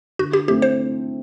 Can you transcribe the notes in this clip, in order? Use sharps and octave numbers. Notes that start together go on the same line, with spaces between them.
D3 F#4
G4
A3 C4 E4 G4
C5